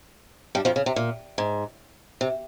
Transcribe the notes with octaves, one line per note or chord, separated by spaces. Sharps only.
G2 G3
F2 F3
C#3
C3
A#2
G#2
C3